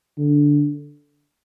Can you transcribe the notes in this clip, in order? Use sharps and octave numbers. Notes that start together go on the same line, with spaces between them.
D3